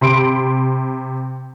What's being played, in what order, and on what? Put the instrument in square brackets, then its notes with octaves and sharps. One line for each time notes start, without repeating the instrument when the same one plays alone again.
[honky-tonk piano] C3 B5 C6 D7